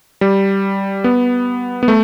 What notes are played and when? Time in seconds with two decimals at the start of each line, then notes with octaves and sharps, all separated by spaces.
0.21 G3
1.04 B3
1.83 B3
1.88 A3